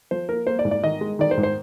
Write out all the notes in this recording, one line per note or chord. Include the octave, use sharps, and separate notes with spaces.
F3 C5
A#3 A#4
A#3 C5
D5
G#2
D5
D#3 D#5
G#3
D#3 D5
C5
G#2
C5